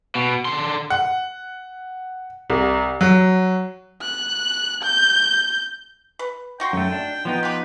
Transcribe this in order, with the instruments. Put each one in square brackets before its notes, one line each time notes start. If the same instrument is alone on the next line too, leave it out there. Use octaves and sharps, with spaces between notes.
[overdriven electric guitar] B2
D3 C6
[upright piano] F#5
C2
F#3
[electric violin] F#6
G6
[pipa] B4
[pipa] D#4 F#4 C6 [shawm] G5
[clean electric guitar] F#2 A3 [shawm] G5
[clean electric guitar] D4
F3 B3 D#4
[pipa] F4 G4 [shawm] B4